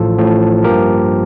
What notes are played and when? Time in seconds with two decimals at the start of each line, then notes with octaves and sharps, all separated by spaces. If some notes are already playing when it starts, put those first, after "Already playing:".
Already playing: A1 A2 F3 F4 A4
0.18 A1 A2 F3
0.64 G2 F3 A#3 G4 A#4